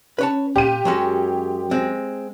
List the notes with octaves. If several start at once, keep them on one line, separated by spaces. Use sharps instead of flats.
C#4 B4 C#5 A5
A#2 G4 D#7
F#2 F#3 G#3 C#4
G#3 C4